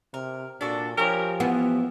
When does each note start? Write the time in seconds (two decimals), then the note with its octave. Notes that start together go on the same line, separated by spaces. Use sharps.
0.14 C3 A#4
0.61 A#2 D4 F#4 A4
0.97 F3 G4 G#4 A#4 C#5
1.40 E3 B3